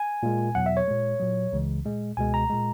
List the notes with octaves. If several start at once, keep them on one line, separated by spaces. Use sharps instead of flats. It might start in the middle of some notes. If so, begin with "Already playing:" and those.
Already playing: G#5
A#2 G#3
E2 B2 F#3 F#5
E5
C#5
A#2 G#3
A#2 F#3
C#2 C#3 E3 G#3
A#2 G#3
C#2 B2 G#3 G#5
A#5
A#2 G#3